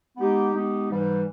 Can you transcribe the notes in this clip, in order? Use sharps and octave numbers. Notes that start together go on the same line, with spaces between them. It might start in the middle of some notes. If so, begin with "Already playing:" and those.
G#3 B3 D#4 G4
G#3 B3 D#4 G4
G#2 E3 G3